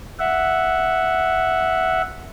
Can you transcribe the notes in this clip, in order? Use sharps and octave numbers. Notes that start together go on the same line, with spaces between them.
E5 F#5